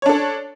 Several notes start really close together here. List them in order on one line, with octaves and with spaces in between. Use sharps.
C#5 D4 A4